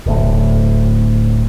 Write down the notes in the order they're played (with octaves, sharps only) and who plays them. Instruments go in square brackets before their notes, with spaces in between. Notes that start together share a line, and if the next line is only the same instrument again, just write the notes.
[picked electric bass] D1 D2 A2